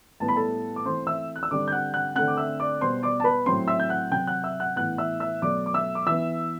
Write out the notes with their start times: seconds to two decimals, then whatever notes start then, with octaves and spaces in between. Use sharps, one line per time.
0.20 A2 G3 B3 A5
0.28 B5
0.36 A4 A5
0.76 D6
0.85 E3 A3 C4 C5 C6
1.07 E5 E6
1.36 F#6
1.43 E6
1.51 D3 G3 C4 D5 D6
1.68 G6
1.72 F#5 F#6
1.94 F#5 F#6
2.16 D3 A3 C4 F#5 F#6
2.28 D6
2.37 E5 E6
2.60 D5 D6
2.81 B2 G3 B3 C5 C6
3.03 D5 D6
3.20 A5
3.24 B4 B5
3.46 A2 F#3 C4 C5 C6
3.68 E5 E6
3.80 G6
3.89 F#5 F#6
4.11 C3 F#3 C4 G5 G6
4.27 F#5 F#6
4.44 E5 E6
4.60 F#5 F#6
4.76 A2 E3 B3 F#5 F#6
4.98 E5 E6
5.20 E5 E6
5.42 B2 F#3 A3 D5 D6
5.66 D6
5.74 E5 E6
5.95 D6
6.07 E3 B3 E5 E6